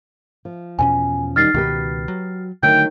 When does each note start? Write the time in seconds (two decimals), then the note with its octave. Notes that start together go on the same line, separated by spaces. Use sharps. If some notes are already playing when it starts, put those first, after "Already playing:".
0.45 F3
0.79 E2 B2 C#4 G#5
1.36 D#3 G3 F6 A6 C7
1.54 C#2 B2 D#3 F#4 G4 B4
2.08 F#3
2.63 D3 D#3 F#3 A3 G5